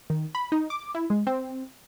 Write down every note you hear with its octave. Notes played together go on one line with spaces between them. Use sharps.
D#3
B5
D#4
D6
E4
G#3
C4